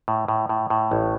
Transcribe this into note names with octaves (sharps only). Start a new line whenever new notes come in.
A2
A2
A2
A2
A1